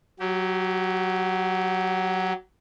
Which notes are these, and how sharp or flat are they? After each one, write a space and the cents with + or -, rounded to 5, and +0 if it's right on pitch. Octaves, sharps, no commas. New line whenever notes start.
F#3 +5 G4 -25